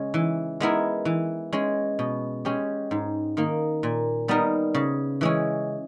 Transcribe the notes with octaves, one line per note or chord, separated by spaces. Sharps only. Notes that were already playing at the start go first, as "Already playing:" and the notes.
Already playing: C#3 G#3 C#4
E3
G#3 B3 E4 A#4
E3
G#3 C#4
B2
G#3 C#4 G4
G#2
D#3 A#3
A#2
G3 B3 D#4 A#4
C#3
E3 G#3 C#4